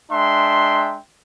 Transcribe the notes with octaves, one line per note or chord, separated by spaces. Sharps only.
G#3 D4 E5 G5 C6